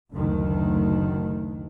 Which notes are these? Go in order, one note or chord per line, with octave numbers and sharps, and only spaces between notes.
F#1 D2 D#3